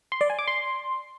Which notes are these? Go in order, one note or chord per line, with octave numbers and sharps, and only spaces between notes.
C6
D5
G#5
D6
C6